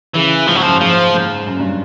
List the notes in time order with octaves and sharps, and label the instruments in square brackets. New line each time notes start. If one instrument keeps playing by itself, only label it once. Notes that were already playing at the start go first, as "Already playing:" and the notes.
[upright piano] C#3 [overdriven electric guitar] E3
[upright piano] G#2 [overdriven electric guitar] F3
[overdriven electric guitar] F#3
[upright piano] F#2 [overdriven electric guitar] F3
[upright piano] G#2 [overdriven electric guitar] F3
[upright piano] G#2
F#2
G2